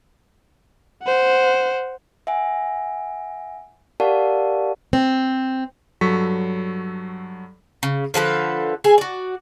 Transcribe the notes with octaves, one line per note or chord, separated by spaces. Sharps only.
C5 F#5
E5 F#5 G#5
G4 A#4 D5 F5 F#5 A5
C4
G2 F#3 A4 C#6 B6
C#3
D3 F3 A4 B4
G#4 A4 G#5
F#4 D5